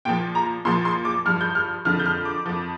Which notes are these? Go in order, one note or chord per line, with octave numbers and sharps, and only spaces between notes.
A#2 F3 G5
A#5
A#2 F3 C6
C6
D6
G2 F3 F6
G6
F6
F2 D3 F3 F6
G6
F6
D6
F2 F3